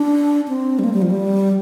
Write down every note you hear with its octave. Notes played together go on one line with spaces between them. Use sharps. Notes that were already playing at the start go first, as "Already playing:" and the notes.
Already playing: D4
C4
G3
A#3
G3
F3
G3